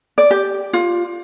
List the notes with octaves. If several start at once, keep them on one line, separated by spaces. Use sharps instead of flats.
D5
G4
F4